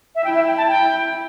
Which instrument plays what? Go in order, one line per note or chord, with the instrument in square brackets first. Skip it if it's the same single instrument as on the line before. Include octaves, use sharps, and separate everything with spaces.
[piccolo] E5
[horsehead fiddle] E4 [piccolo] G5
[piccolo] E5
G5
A5
G5